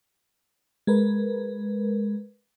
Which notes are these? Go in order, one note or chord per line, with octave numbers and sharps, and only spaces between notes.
G#3 A#4 B4